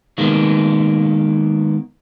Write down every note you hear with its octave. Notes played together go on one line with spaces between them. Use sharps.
D#3 G#3 A#3 B3